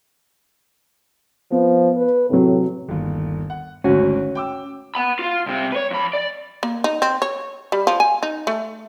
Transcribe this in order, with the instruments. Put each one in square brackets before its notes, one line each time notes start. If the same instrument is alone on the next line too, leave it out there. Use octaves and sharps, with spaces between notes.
[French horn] F3 [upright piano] B3
[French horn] B4
[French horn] A2 [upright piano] C3 F#3
[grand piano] G1 D#2
F#5
[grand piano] G#1 D2 [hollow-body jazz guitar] C#4 F#4
[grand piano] G5 D6 E6
[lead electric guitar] F#5 B5
F4 F5
C2 C3
B4 C#5
F2 B5
D5
[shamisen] A#3
D#4
C4
C#5
G3
F3
G#5
D#4
A3